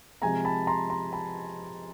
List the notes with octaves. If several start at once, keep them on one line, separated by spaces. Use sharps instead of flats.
C3 F3 G#3 G#5 A#5
A5 B5
A#5 C6
A#5 C6
A5 B5